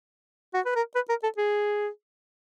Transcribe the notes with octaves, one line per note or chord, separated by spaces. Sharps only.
F#4
B4
A#4
B4
A#4
A4
G#4